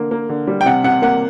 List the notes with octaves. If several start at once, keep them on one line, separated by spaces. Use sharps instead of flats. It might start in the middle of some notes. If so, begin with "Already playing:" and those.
Already playing: D3 A#3
A#3
D3
G3
G5
C3 F#5
C3 F#5
A#3 F#5